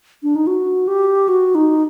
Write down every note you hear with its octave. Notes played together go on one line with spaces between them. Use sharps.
D4
D#4
F#4
G4
F#4
D#4